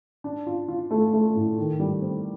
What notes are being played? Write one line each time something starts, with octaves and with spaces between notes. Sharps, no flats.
D4
F4
F4
A3
A3
A2
D#3
G3
C4